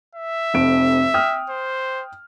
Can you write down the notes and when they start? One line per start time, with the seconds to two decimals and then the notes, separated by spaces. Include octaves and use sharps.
0.15 E5
0.54 F1 F2 D7
1.14 G5 D#6 F6
1.50 C5